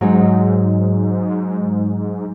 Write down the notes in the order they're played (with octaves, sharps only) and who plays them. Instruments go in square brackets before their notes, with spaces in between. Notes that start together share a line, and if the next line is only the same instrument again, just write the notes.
[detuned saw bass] G#2 [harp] F#3 G#3 D#4